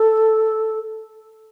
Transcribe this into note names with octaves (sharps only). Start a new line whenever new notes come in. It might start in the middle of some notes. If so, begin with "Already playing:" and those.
Already playing: A4